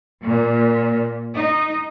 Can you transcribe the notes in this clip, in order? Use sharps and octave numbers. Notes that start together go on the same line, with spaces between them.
A#2
D#4